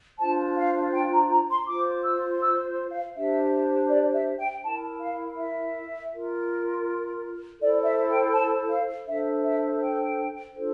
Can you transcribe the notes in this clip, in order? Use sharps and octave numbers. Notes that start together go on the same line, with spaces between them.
D4 F4 C5 A5
F5
G5
A#5
A#5
C6
F4 C5 D6
E6
E6
F5
D4 G4 C5 E5
D5
E5
G5
E4 A#4 A5
F5
E5
F4 A#4
E4 A4 C5 D5
E5
G5
A5
F5
D4 A4 C5 E5
E5
G5
D4 F4 A4 C5